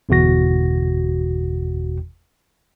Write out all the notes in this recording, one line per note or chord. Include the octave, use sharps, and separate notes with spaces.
G1 E2 B2 F#4 A#6